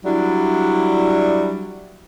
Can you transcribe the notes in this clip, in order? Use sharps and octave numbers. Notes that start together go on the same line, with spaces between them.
F#3 G3 D4 E4